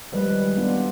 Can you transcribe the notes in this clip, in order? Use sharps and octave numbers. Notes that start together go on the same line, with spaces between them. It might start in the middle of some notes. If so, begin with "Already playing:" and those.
D#3 F3 G3 G#3 B4
B3 D4 F4